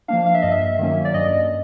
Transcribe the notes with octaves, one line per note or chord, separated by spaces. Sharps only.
F3 A#3 D4 F5
F5
E5
G2 D#5
E5
D#3 F#3 A#3 C#4
D5
G2 D#5